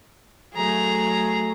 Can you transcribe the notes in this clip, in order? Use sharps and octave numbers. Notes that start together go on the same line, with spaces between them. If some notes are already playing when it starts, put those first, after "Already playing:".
F#3 A3 G#4 A#5